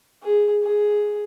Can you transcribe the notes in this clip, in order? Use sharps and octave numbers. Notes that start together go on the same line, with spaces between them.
G#4
G#4